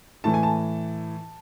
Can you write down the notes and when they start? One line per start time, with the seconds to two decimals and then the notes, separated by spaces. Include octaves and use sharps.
0.24 A2 E3 A5
0.34 G#5
0.43 A5